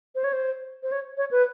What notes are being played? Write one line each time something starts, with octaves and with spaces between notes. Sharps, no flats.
C5
C#5
C5
C5
C#5
C#5
B4